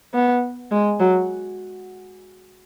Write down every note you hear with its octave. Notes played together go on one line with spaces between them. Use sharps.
B3
G#3
F#3